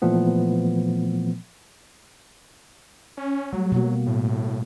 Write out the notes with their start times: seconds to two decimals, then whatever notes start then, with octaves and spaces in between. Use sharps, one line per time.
0.02 A#2 E3 F3 A3 B3
3.17 C#4
3.53 F#3 G3 A3
3.72 B2 A#3 F#4
4.06 A2